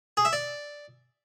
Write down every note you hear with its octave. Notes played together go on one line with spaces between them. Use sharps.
G#4
E5
D5